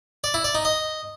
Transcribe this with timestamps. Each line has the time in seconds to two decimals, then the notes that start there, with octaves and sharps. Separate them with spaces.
0.24 D5
0.34 E4
0.44 D5
0.55 D#4
0.65 D#5